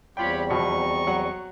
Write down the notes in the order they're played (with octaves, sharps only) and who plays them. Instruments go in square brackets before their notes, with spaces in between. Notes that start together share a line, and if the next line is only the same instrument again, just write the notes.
[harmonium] E2 G3 C4 [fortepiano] F4 G5 [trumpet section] G4 C#5 B5
[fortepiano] F2 B2 [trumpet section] D#5 A#5 C#6
[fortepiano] F#3 F#5